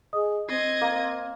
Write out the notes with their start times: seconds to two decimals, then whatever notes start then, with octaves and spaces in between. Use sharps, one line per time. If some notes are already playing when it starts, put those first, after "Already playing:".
0.13 G#4 D#5 D#6
0.49 C4 D#5 G#6 C7
0.81 A#3